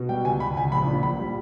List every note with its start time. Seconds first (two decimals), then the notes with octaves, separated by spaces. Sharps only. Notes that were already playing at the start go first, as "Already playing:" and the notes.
Already playing: B2
0.09 G3 G5
0.25 C#2 G#5
0.40 C#2 B5
0.56 C#2 G#5
0.72 A#1 B5
0.87 A#2
1.03 A#1 B5
1.19 G3